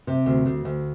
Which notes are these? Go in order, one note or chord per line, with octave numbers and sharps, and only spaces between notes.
C3
D2
D2
D2